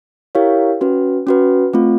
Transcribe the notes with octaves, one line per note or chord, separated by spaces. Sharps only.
E4 G4 A#4 C#5 F5
C#4 F#4 B4
C#4 F#4 B4
A3 C4 F4